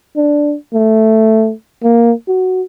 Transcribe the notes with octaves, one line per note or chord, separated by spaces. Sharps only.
D4
A3
A#3
F#4